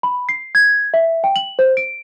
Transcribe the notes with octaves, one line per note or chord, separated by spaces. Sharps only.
B5
C7
G#6
E5
G5
F#7
C5
D7